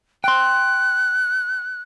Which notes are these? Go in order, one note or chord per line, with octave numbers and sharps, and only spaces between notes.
G5 C6 F#6